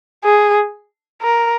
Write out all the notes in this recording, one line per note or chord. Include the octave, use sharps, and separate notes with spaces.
G#4
A#4